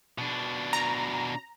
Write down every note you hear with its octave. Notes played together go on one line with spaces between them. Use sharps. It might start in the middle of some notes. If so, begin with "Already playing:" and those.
B2 D4
A#5